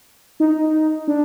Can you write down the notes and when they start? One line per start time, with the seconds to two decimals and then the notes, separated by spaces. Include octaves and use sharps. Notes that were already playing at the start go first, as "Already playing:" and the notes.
0.40 D#4
1.08 D4